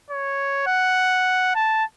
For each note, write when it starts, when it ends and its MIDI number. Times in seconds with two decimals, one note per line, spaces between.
0.10 0.63 73
0.67 1.52 78
1.55 1.84 81